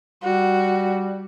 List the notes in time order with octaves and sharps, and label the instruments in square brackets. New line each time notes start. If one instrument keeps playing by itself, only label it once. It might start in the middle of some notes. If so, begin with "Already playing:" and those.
[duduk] G3 [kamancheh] F#4